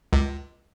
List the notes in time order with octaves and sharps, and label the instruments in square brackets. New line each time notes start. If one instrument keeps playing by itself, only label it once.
[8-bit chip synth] C#2